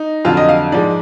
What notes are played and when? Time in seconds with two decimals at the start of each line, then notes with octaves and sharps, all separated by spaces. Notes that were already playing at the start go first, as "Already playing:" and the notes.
Already playing: D#4
0.25 F2 D3 F#3 F4
0.37 D#5
0.49 F5
0.72 G#2 F3 G#3 D5